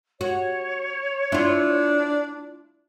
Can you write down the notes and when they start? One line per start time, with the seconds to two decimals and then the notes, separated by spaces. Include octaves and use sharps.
0.21 F#4 C#5
1.32 D4 E4 F4